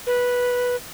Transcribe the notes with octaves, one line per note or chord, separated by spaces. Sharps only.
B4